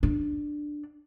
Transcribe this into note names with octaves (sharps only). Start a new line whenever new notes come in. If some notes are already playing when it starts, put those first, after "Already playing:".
D4